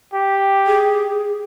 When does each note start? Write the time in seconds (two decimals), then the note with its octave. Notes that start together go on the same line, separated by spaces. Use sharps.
0.13 G4
0.67 G#4